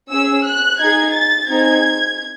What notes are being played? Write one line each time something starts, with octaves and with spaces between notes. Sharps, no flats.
C#4 G#4 E6
F#6
D#4 G#4 G#6
A6
C4 D#4 G#4 G#6